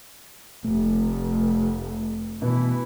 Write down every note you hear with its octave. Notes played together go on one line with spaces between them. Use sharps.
F1 A3
B2 E3 B5